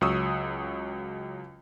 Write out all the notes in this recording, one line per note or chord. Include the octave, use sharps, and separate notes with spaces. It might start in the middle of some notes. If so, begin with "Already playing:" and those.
C#2 F#3 C#6 D#6 E6